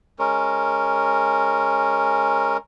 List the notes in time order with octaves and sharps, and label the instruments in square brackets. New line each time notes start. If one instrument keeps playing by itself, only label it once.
[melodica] G#3 C#4 A#4